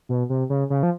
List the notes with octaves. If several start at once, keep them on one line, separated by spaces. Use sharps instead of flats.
B2
C3
C#3
C#3
F3